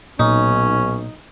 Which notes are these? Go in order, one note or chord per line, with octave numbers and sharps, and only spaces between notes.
B1 A#2 C#4 D#4